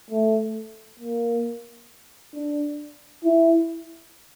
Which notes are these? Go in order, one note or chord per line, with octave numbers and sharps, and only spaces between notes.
A3
A#3
D4
E4